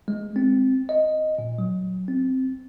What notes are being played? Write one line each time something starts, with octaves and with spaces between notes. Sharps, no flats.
G#3
C4
D#5
A#2
F#3
C4